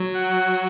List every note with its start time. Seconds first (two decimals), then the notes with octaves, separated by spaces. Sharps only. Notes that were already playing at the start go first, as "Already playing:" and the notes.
Already playing: F#3
0.15 F#5